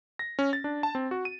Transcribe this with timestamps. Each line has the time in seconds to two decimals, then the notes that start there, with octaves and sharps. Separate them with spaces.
0.19 A#6
0.39 C#4
0.53 A6
0.64 D4
0.83 A5
0.95 C4
1.11 F#4
1.25 D#7